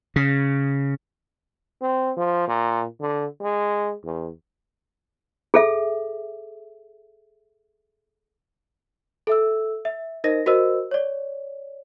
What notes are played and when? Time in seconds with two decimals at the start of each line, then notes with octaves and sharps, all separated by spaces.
0.16 C#3
1.81 C4
2.17 F3
2.47 A#2
3.00 D3
3.41 G#3
4.04 E2
5.54 G#4 A4 E5
9.27 A4 E5 E6
9.85 E5
10.24 D#4 A#4 C5 D#5 A#6
10.46 F#4 A#4 C5 D#5 E6
10.91 C#5 D5